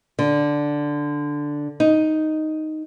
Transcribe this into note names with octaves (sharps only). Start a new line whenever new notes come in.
D3
D#4